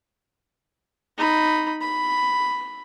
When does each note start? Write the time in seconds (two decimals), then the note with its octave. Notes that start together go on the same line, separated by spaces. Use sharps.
1.18 D#4 B5
1.81 B5